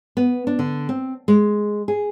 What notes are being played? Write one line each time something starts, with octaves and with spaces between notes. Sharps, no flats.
B3
D4
D3
C4
G#3
G#4